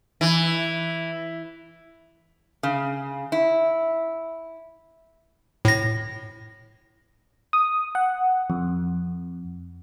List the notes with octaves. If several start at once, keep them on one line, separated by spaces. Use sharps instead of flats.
E3
C#3
E4
A2 A#6
D#6
F#5
F2